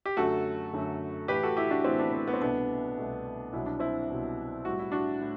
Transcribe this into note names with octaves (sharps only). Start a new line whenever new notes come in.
G4
F#2 D3 F#3 A3 F#4 A4
F#2 D3 F#3 A3
A2 E3 A3 G4 B4
F#4 A4
E4 G4
D4 F#4
A2 E3 A3 C4 E4
B3 D4
C4
B3
C4
C2 B2 A3 B3 D4
C2 B2 A3
C2 B2 F#3 E4
D4
C4 E4
C2 B2 F#3
A2 G3 F#4
E4
D4 F#4
A2